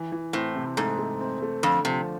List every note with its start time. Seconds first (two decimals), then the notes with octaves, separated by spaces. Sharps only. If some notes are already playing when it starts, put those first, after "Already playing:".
Already playing: E3
0.12 E3
0.33 A2 C4
0.56 C3
0.77 G#2 A3
0.99 A3
1.21 C4
1.42 A3
1.63 F2 D3
1.85 C3 F3